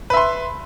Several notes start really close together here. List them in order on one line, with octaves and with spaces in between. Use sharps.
B4 E5 C6